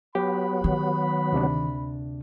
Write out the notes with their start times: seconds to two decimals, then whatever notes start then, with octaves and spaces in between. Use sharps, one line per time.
0.15 F#3 B3 G4 B5
0.64 D#3
1.32 D2 C3 D4